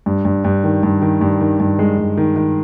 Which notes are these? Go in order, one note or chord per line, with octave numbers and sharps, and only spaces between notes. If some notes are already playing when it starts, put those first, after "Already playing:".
G2
G2
G2
D#3
G2
D#3
G2
D#3
G2
G#3
G2
D#3
D#3